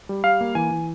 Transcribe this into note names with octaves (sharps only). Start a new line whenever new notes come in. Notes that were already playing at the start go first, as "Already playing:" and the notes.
G3
G3 F5
A#3
E3 G#5
E3